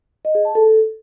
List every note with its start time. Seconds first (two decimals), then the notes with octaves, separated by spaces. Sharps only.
0.25 D#5
0.35 G#4
0.45 A5
0.55 A4